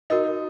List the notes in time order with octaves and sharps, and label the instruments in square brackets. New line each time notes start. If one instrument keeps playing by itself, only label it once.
[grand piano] D#4 [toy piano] F#4 A#4 D#5